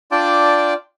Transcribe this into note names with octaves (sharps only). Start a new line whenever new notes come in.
D4 F4 D5 G5 A5 D6